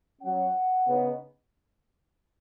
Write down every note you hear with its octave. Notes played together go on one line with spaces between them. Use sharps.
F#3 C#4 F#5
C#3 B3 D#4